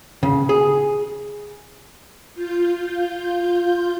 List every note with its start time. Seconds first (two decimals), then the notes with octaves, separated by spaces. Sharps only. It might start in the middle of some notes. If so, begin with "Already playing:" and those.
0.23 C#3
0.49 G#4
2.35 F4 G6